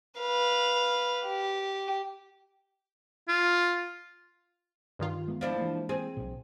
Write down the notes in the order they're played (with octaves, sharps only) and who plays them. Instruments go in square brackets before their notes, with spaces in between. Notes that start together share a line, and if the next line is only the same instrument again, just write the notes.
[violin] B4 F5
G4
[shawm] F4
[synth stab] G2 D#3 F4
[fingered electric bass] G#3 B3
[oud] F3 D4 E4
[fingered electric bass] E3 G#3 A#3
[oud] C4 G#4
[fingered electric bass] B1 A#2